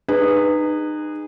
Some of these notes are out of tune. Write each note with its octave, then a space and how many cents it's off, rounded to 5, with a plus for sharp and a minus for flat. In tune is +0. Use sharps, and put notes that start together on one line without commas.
D#4 -30 G#4 -20 B4 +0